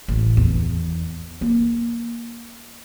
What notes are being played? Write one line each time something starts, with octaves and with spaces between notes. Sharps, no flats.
A1
E2
A#3